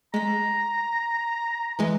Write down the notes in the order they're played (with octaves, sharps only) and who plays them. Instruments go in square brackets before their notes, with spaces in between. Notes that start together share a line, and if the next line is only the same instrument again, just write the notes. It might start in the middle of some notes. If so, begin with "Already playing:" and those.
[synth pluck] G#3 B6 [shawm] A#5
[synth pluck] E3 G#3